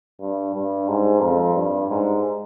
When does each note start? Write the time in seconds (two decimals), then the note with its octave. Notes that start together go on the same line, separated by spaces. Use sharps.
0.21 G2
0.55 G2
0.88 G#2
1.21 F2
1.55 G2
1.90 G#2